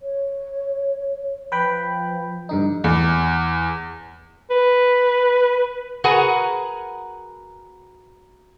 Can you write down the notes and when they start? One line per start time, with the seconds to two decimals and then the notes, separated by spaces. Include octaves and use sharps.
0.02 C#5
1.52 F3 B4 G5 B5
2.49 G2 D3 D#4
2.84 E2
4.50 B4
6.04 F#4 G#4 A#4 B4 F#5 G#5